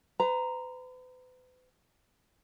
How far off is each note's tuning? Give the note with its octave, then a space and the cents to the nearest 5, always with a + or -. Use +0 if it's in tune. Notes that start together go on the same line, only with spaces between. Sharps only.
B4 +45 A#5 +0